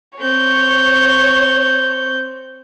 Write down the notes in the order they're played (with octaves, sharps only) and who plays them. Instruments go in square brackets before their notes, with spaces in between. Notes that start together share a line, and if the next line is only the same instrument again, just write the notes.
[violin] C4 G6 [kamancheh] C#5